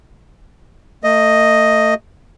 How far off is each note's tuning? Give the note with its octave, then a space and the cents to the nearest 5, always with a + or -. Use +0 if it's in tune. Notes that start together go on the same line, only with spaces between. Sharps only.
A3 +35 D#5 +0